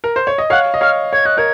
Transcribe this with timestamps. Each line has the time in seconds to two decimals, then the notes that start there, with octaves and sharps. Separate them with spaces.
0.04 A#4
0.16 C5
0.27 C#5
0.38 D#5
0.50 C#5 F5 F#5
0.74 D#5
0.81 C#5 F5 F6
1.13 C#5 G#6
1.25 D#5 F#6
1.37 A#4 C#5 G#6